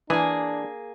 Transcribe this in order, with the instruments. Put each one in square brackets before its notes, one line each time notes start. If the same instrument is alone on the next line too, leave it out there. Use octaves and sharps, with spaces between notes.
[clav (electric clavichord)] E3 [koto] A#3 G#4 [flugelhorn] D4